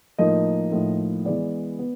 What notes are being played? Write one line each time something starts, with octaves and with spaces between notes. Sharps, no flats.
A2 F3 A#3 D#4 D#5
A2 F3 A#3 D#4
E3 G#3 B3 D5
B3